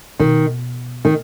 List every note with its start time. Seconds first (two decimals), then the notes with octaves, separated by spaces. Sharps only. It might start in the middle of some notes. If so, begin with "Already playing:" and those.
0.19 B2 D#3
1.05 D#3